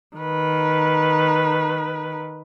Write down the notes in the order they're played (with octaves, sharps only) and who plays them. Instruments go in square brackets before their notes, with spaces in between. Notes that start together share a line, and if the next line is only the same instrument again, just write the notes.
[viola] D#3 B4